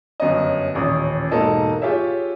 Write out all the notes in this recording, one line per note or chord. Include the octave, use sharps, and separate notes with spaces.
G1 F#2 C#5 D#5
D#1 A1 C#5 D#6
E1 G#2 A#3 D#4 A4 D#5
F4 G4 G#4 C#5 E5